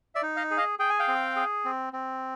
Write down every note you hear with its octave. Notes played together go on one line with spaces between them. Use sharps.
D5 E5
D#4
D#5 F5
G#4
D#5 F5
G#4 G5
G#5
F5 G5
C4
G#4
C4
C4